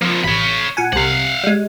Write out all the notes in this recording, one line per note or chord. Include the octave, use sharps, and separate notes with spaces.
F3 A#3 C4
A1 C#5 B5
A#2 F#5 G#5
C2 C3 F5 F#5
G3 G#3